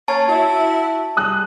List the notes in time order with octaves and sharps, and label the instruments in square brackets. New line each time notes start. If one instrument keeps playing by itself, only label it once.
[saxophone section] A#3 C#4 C#5 [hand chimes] A5
[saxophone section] E4 F#4
[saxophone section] G3 G#4 [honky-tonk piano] D#6 F#6